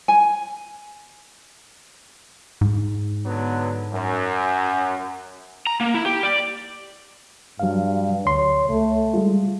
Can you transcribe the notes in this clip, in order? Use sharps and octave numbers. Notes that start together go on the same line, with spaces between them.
G#5
G#2
D3 F#3 B3
F#2
A#5
A#3
E4
G4
D5
G2 F#3 F5
D2 C#5 C6
C#2 A3
G3 G#3 F4